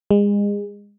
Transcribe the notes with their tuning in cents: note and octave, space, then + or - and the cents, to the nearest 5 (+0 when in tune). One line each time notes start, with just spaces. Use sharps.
G#3 -30